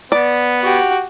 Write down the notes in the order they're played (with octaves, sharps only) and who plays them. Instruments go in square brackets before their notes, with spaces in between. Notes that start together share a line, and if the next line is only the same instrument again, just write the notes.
[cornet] B3 [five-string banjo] D5
[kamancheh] F#4 G4